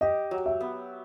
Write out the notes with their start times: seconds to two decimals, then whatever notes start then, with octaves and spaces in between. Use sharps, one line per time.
0.01 G4 D#5
0.31 F#3
0.46 E5
0.61 B3